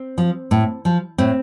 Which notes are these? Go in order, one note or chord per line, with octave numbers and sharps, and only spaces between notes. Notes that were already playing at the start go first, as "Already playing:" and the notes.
Already playing: C4
F3
A2
F3
A2 C4